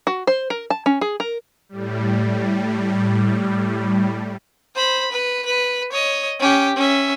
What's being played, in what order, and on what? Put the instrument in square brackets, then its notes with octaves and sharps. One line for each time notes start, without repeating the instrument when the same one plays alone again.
[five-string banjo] F#4
C5
A#4
A5
C#4
G#4
A#4
[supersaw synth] A2 G3
[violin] C5 B5
B4
B4
C#5 D#5
C#4 G4
C#4 E5